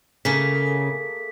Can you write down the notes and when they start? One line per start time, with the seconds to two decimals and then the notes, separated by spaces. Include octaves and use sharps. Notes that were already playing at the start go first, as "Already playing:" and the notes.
0.25 C#3 A3 A#3 G#4 B6